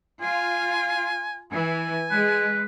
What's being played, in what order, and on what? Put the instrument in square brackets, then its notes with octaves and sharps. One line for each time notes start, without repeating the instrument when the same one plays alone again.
[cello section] F4 [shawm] G#5
[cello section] E3 [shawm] G#5
[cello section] G#3 [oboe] B4